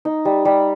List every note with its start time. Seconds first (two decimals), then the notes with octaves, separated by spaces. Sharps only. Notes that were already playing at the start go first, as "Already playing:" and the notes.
0.05 D#4
0.25 G3
0.45 G3